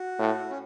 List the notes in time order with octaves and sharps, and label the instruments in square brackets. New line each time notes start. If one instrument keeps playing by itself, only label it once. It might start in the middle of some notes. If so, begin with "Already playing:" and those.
Already playing: [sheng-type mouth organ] F#4
[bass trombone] A2
[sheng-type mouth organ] C#4